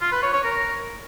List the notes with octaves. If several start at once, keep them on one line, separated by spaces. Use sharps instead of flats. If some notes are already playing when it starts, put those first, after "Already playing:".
F4
B4
C#5
C#5
A#4